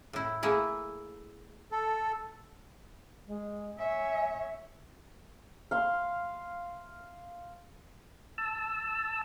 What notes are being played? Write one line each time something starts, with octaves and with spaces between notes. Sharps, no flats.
A2 E4
A3 A#3 E4 G#4
A4
G#3
C#5 E5 G#5
F5 C6
A5 E6